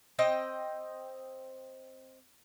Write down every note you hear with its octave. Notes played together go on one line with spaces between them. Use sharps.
C4 D#5 G5